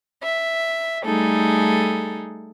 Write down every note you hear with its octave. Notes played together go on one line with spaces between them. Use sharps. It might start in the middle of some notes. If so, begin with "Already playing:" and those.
E5
G3 A3 D#4 G#4 A4